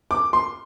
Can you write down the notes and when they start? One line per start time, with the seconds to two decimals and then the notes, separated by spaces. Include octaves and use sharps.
0.11 D6
0.33 C6